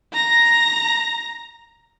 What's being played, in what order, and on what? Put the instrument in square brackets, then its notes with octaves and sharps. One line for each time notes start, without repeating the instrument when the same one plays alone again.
[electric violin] A#5 A#6